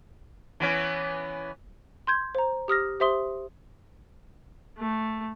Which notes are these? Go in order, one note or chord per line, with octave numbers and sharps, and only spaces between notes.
E3 B3 C#4
C6 G6 G#6
C5 A#5
G4 D#6 F6 A#6
G4 C5 E5 C6 D#6 G7
A3